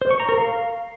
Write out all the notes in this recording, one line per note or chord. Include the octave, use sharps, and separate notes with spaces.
C5
C#6
A#5
A#4
F5